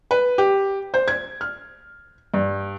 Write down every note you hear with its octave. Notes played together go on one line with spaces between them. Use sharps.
B4
G4
C5
G#6
F6
G2